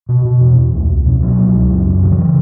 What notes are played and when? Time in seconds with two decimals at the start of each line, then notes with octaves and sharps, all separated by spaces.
0.09 B2
0.25 B2
0.41 E2
0.58 E2
0.74 C#2
0.90 C#2
1.05 B2
1.22 B2 F#3
1.38 C#2
1.54 C#2
1.70 F#2
1.86 F#2
2.03 C#3
2.12 D#3
2.18 C#3 E3